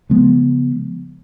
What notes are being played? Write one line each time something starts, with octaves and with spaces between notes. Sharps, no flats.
C#3 F3 G#3 B3